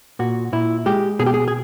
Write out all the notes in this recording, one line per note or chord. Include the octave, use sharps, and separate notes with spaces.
A#2 F#4
A#2 E4
G#3 G4
B2 G#4
G4
G#4
G#4